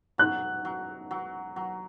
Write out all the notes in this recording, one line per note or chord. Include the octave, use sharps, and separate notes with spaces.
F#3 F#6
F#3
F#3
F#3